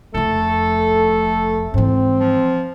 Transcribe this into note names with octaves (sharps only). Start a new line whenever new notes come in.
F1 F2 A3 A4
G#2 E3 C4
F3